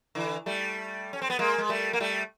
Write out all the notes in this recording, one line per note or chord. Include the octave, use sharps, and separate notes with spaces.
D3 E3
G3 A3
C#4
C4
B3
G#3 A#3
G#3
G3 A3
A#3
G3 A3